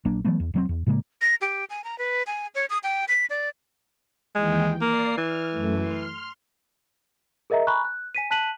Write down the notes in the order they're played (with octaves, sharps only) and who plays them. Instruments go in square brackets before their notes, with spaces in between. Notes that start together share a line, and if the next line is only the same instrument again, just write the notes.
[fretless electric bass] A#1 F#3 A#3 D4
E3 F#3 A3 B3
E2
E1 F#3 C4
E2
A2 C#3 G#3 A#3
[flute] A#6
G4
G#5
A#5
B4
G#5
C#5
D#6
G5
B6
D5
[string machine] D#2 E3 G5 [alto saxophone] G#3
[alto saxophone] A#3 [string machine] D5 C7
[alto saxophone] E3 [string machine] F6
[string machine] F#2 A3
C6 F6
[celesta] G#4 A#4 D#5 E5 A#5
G#5 A#5 B5 C#6 F#6
F#6
G#5 B6 D#7
A5 F#6 B6 D#7 F#7